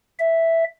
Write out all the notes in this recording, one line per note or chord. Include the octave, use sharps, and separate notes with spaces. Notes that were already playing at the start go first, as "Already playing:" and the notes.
E5